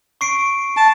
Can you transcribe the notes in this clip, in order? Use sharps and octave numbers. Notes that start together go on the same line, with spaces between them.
C#6 C7 D7
A5